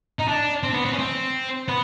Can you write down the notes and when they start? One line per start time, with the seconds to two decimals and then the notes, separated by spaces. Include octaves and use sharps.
0.19 D#4
0.28 D4
0.63 C4
0.74 B3
0.85 C4
0.93 C#4
0.99 C4
1.68 B3